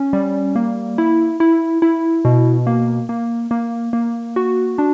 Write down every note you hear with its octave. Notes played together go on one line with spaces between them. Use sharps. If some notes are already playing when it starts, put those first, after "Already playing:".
Already playing: C#4
G3
A#3
E4
E4
E4
B2
A#3
A#3
A#3
A#3
F#4
D4